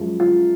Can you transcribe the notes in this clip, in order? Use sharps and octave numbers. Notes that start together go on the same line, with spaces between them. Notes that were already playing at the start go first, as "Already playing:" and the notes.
Already playing: F#2 F3 G#3
F4